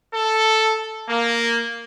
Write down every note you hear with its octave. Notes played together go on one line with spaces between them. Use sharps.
A4
A#3